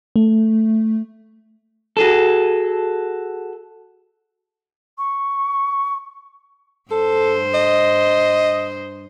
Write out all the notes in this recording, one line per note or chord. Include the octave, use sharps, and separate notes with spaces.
A3
F#4 G#4 A4
C#6
G2 A4 C5
D#5